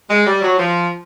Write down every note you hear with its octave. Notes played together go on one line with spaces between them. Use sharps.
G#3
G3
F#3
F3